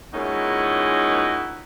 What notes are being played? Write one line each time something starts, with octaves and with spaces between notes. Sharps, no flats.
A#2 G#3 C#4 D#4 E4 F#4